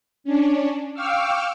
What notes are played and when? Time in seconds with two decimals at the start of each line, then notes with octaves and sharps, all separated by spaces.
0.24 C#4 D4
0.94 F5 G5 C#6 D6 E6 F6